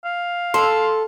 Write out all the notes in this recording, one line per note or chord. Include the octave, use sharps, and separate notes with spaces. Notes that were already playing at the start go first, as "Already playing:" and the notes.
F5
A4 C6